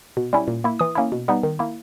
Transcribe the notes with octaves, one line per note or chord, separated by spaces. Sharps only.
B2
G3 C#4 E4
A#2
A#3 E4
E3 D#6
A#3 C#4 E4
B2
G3 B3 D#4
D#3
A#3 E4